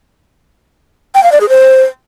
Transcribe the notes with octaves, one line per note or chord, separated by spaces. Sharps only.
G5
F5
D5
G#4
C5